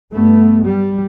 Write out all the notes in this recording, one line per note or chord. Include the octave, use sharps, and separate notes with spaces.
G2 A3 B3
G3